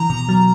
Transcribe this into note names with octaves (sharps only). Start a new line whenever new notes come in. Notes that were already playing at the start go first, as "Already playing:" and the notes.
Already playing: E3 A#5
B2
F#3